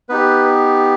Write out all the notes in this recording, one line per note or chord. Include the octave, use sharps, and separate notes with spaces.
B3 D#4 G4 B4